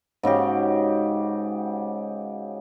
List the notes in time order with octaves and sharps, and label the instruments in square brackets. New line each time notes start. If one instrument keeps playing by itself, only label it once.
[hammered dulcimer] G#2 C#3 F#4 G4